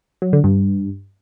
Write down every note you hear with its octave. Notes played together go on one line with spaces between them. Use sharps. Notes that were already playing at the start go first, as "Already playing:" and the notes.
F#3
D3
G2